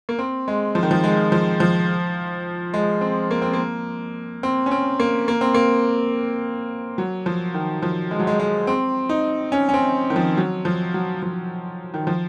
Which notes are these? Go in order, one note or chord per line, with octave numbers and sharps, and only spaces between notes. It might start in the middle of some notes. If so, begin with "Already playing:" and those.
A#3
C4
G#3
F3
D#3
F3
G#3
F3
F3
G#3
C4
A#3
C4
A#3
C4
C#4
C4
A#3
A#3
C4
A#3
F#3
F3
D#3
F3
G#3
F#3
G#3
G#3
C4
D#4
C#4
C#4
C4
D#3
F3
F#3
F3
F#3
F3
D#3
F3